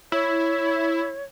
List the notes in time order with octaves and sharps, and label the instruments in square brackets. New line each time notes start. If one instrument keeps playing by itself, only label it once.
[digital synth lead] E4 [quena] C#5